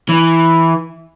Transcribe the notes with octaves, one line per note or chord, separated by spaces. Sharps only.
E3